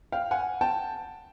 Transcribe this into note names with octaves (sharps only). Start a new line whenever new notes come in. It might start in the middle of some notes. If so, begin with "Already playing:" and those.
F5 G5
F#5 G#5
G5 A5